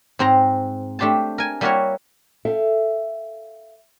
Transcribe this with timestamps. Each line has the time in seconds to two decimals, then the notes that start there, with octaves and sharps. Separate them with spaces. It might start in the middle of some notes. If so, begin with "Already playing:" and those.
0.19 G#2 C4 C5 A#5
0.99 A3 D4 G4 C5 A5
1.38 A#4 G#5
1.61 G3 A#3 E4 F#4 A#4 C#5
2.45 A4 E5 F5 G5